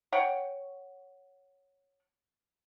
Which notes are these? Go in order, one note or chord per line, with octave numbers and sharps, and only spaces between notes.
C#5 F#5 G5